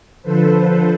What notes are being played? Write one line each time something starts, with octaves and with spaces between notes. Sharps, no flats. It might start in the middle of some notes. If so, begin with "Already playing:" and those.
D3 F3 A4 B4 C5